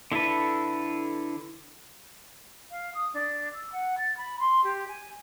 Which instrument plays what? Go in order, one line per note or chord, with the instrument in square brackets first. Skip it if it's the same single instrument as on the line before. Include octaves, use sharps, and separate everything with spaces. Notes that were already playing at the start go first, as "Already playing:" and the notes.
[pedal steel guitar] D3 E4 A4 B4
[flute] F5
D#6
D4
E6
F#5
A6
B5
C6
G4
G#5